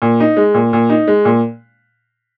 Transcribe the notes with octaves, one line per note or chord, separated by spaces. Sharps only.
A#2
D#4
G#3
A#2
A#2
D#4
G#3
A#2